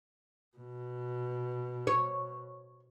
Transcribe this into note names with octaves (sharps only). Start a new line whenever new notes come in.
B2
C#5